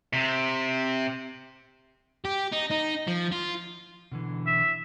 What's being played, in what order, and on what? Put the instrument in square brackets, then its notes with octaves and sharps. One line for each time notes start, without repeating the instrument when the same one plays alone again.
[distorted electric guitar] C3
G4
D#4
D#4
F3
F4
[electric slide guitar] B2 D3 E3
[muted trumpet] E5